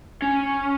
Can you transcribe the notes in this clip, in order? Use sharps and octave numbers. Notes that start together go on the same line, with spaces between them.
C#4